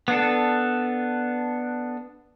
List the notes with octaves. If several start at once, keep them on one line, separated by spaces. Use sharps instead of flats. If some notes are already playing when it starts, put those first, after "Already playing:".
B3 D4 A4